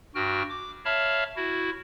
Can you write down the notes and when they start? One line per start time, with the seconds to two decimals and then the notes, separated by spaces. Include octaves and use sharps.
0.15 G2 F#4 G5 F6
0.50 D6
0.85 C#5 E5 F5 A5 B5 F6
1.36 E4 F#4